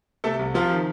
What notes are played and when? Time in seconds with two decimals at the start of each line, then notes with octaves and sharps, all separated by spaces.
0.24 C3 A3 A4
0.39 C2
0.54 C3 F3 F4
0.70 D#3